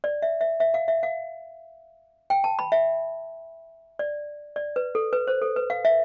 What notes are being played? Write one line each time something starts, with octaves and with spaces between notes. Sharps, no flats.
D5
E5
E5
E5
F5
E5
F5
G5
A5
B5
E5
D5
D5
B4
A4
B4
C5
A4
B4
F5
E5